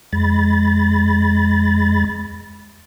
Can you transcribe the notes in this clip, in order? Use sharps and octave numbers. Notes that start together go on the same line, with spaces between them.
F2 G#3 B5 A6